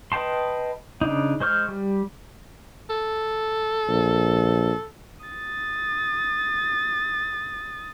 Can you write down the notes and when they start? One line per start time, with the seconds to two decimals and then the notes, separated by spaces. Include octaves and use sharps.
0.12 B4 D#5 G5 A5 C6
1.01 C#3 D4 D#4
1.40 G#3 C5 C#6 F6 G6
1.69 G3
2.90 A4
3.88 A#1
5.25 D#6 A6